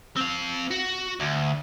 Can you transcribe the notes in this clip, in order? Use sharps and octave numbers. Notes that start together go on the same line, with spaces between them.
C4 F5
F#4
D2